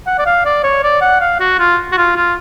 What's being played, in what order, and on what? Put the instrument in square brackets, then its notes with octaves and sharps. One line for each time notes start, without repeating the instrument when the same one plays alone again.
[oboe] F#5
D5
F5
D5
C#5
D5
F#5
F5
F#4
F4
F#4
F4
F4